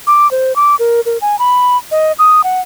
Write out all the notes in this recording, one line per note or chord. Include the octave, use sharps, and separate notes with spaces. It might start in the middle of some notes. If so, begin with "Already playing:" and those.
D6
C5
D6
A#4
A#4
G#5
B5
D#5
D#6
F#5